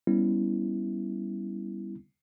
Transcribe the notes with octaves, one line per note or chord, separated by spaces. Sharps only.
G3 B3 C#4 E4